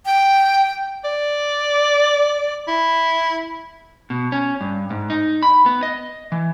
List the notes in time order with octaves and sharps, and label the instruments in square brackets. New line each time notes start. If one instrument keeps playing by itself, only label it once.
[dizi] G5
[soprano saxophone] D5
E4
[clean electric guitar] B2
C#4
G2
G#2
D#4
B5
B3
D#5
E3